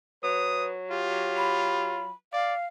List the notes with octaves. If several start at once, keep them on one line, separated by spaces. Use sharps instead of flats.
F#3 B4 D#6
F4 G4
B5
D5 F5